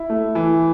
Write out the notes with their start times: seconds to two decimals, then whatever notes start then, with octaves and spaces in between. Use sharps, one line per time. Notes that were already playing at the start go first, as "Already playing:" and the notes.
Already playing: E4
0.10 A3
0.35 E3